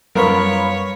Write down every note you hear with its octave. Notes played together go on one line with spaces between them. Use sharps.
F#2 G3 B3 A#4 C#5 F5 B5